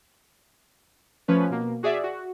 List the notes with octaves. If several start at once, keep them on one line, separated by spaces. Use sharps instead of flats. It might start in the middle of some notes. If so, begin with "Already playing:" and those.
F3 A3 C#4 B4 C#5
B2 A#3
F#4 G#4 D5 E5
F#4